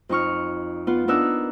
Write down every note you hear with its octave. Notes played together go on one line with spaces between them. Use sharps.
F2 D#4 C#6 F6
B3 F4
B3 D4 D#4 A#4 E6 F#6